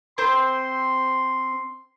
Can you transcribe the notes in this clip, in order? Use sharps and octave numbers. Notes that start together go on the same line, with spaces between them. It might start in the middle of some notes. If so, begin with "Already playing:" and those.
C4 C5 C6